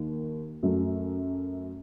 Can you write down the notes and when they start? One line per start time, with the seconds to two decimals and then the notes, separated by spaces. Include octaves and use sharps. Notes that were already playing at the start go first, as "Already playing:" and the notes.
Already playing: D#2 D#3
0.63 F#2 F#3 A3